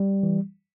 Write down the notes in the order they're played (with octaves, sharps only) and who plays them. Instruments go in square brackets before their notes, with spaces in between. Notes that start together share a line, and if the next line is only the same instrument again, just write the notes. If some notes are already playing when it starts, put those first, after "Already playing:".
Already playing: [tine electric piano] G3
E3